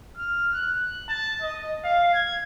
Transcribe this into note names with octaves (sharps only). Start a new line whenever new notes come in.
F6
F#6
A5
D#5
F5
G#6